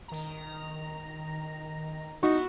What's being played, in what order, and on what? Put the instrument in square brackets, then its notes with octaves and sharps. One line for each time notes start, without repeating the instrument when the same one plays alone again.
[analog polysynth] D#3 A#5
[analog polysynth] B3 E4 [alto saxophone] D#4 [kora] F#4